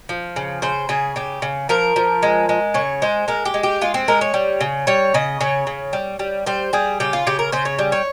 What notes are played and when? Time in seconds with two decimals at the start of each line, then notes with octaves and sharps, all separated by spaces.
0.09 F3
0.36 C#3
0.62 C#3 C5
0.89 C#3 G#4
1.16 C#3 G4
1.42 C#3
1.69 F3 A#4
1.96 F3
2.23 G#3
2.49 G#3
2.74 C#3 C#5
3.02 G#3 C5
3.28 G#3 A#4
3.45 G4
3.54 G#3
3.63 G4
3.81 G#3 F4
3.94 C4
4.08 G#3 A#4
4.21 C#5
4.34 G3
4.61 C#3
4.87 G3 C#5
5.14 C#3 D#5
5.41 C#3 C#5
5.67 C#3
5.93 G3
6.19 G3
6.46 G3 C5
6.73 G3 G#4
7.00 C#3 G4
7.13 F4
7.27 C#3 G4
7.39 A#4
7.52 C#3 C5
7.65 C#5
7.79 G3
7.92 C#5